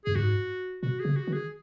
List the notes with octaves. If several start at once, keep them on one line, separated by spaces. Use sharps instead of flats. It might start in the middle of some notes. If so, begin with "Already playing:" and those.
F#2 G#4
G#2 F#4
B2 F#4
G#4
C#3
F#4
D#3
G#4